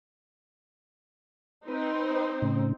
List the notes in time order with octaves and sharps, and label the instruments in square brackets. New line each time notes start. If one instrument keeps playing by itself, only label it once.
[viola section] C4 D#4 C5 [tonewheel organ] B4
[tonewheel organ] A2 C#3